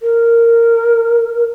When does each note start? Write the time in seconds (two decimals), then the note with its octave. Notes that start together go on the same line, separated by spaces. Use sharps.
0.01 A#4